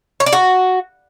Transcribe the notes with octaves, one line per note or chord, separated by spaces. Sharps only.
C#5
D5
F#4